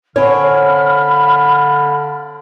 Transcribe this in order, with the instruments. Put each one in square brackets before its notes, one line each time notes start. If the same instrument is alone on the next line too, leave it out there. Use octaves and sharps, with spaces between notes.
[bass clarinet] D3 [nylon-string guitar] C4 C#4 C#5 [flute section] F5 B5 F6